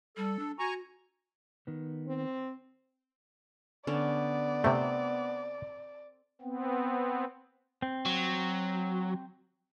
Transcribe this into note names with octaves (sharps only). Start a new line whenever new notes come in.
G3 A4
D4
F#4 G#5 A#5 C#6
D#3 B3
C4
D3 B3 C#4 D4 D5
C3 A3 C4
B3 C4
C4
F#3